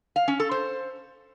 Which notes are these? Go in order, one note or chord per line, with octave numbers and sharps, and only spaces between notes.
F5
C#4
A4
C5